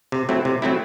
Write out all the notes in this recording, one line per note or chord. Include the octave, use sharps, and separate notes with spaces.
C3
F#3 A3 C4 E4
C3
F#3 A3 C4 E4